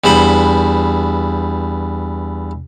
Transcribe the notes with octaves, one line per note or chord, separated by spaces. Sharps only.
E2 G2 C5 B5 C6